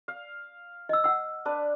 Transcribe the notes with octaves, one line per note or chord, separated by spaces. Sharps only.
F5
D#5 E6
F#5 E6
D4 B4